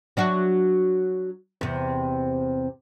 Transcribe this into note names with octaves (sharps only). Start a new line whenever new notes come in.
F#3 D4 F#4
E2 C3